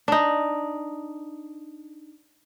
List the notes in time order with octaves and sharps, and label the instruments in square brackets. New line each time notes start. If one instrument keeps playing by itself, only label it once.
[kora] D4 D#4